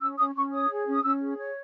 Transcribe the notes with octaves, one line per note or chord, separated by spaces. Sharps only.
C#4 E6
C#4 D#6
C#4 C#6
C#5 D#6
G#4
C#4 D#6
C#4 E6
G#4
C#5